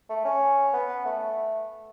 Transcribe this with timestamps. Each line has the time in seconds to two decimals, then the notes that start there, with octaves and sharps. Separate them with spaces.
0.10 A3
0.25 C#4
0.73 B3
1.05 A3